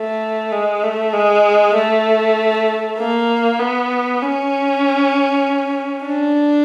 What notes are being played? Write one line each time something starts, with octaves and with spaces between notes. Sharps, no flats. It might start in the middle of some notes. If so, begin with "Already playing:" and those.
Already playing: A3
G#3
A3
G#3
A3
A#3
B3
C#4
D4